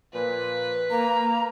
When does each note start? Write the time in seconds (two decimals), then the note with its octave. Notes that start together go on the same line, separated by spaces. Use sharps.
0.13 A#2 F3 B4
0.91 A#3 A#5